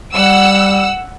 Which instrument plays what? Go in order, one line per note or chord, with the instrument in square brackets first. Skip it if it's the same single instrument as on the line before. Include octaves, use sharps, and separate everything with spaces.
[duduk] G3 [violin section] F#5 E6